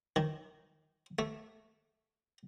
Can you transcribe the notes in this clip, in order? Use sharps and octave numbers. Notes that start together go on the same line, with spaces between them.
D#3
A3